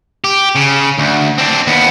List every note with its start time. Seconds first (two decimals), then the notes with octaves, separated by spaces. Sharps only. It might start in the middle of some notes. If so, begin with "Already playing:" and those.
0.24 G4
0.55 C#3
0.98 D2
1.38 C4 D4
1.67 D#2 B3